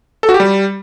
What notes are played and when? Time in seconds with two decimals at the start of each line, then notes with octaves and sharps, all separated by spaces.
0.23 A4
0.29 F#4
0.34 G4
0.40 G3